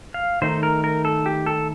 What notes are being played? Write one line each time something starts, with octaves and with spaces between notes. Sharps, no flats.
F5
D#3 A3 D#4 C5
A#4
A#4
A4
G4
A4